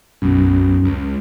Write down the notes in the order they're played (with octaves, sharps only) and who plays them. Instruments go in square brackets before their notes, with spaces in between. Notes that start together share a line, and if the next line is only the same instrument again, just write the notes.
[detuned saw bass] B1 [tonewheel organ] F#2
[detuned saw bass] C#2